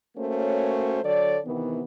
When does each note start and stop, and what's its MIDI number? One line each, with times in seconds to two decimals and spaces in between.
0.17 0.99 57
0.17 0.99 58
0.17 0.99 61
0.17 0.99 66
0.17 0.99 72
0.17 0.99 73
1.03 1.38 50
1.03 1.38 54
1.03 1.38 69
1.03 1.38 73
1.03 1.38 74
1.45 1.82 48
1.45 1.82 51
1.45 1.82 52
1.45 1.82 59